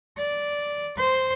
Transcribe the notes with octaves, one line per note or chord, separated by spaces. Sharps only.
D5
C5